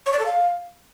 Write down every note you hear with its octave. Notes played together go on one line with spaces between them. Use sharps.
C#5
D5
A4
F5